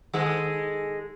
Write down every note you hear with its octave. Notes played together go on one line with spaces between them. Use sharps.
D#3 G#3 A4